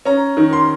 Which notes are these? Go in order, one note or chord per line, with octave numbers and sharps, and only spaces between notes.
C#4 A#5
D#3
C6